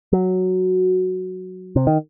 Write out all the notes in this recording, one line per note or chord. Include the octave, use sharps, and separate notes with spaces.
F#3
C3
D#3